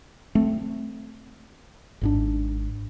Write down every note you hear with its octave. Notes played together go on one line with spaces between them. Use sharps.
A3 C4
G#1 G#2 D4